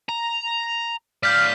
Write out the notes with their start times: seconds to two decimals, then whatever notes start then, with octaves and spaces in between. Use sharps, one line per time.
0.09 A#5
1.23 A2 D5 F5 F6 G6 B6